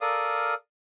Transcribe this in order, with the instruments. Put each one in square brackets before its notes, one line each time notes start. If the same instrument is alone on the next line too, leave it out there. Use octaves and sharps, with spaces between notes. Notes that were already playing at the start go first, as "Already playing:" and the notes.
[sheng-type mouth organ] A4 A#4 D5 F5 D#6